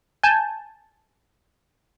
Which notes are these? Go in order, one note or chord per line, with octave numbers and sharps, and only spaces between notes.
G#5 A5 G6